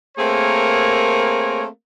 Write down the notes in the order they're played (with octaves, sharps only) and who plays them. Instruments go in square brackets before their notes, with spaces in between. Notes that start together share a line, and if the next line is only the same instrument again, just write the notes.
[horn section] A3 A#3 C4 G#4 A#4 C#5